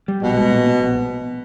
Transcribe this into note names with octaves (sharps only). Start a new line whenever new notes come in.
G3
A#1 B2
G#3
A#2
B3
A#1